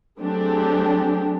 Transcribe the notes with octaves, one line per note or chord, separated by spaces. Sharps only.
F#3 A3 C4 D4 G4 G#4